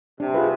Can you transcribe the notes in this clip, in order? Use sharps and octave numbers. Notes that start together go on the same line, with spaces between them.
C3 D4
F4 G#4 B4